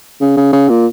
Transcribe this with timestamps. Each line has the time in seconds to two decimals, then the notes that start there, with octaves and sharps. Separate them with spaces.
0.21 C#3
0.37 C#3
0.53 C#3
0.69 A#2